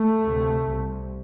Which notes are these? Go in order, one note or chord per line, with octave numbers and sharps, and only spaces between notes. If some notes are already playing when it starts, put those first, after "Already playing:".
Already playing: A3
D2 C3
C2 C3